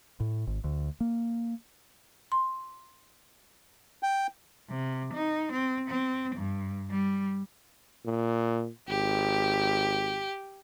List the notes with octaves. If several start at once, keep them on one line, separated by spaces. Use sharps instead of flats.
A2
G#1
D2
A#3
C6
G5
C3
D#4
C4
C4
G2
G3
A#2
G#1 G4